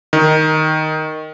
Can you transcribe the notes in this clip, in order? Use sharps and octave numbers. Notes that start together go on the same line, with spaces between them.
D#3